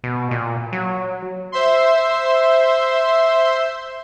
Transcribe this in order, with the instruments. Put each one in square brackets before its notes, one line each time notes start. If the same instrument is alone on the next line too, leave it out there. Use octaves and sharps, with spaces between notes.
[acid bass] B2
A#2
F#3
[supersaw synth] C5 E5 C6